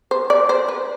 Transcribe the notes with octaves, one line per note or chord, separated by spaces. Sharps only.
C5
D5
C5
B4